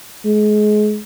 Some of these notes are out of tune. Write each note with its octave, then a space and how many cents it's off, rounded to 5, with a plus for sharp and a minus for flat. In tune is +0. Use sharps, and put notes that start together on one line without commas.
G#3 +30